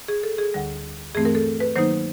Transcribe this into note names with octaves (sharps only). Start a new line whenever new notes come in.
G#4
A4
G#4
D2 D3 G3
G2 E3 A3 C4 G#4
A#4
A4
B4
D#3 F#3 A#3 D#4 C5